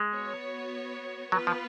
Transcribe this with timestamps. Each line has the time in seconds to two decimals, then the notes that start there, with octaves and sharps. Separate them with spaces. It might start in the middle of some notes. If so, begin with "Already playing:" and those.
Already playing: G#3
0.11 B3 F#4 C#5
1.32 F#3 B3 F4 B4
1.47 F3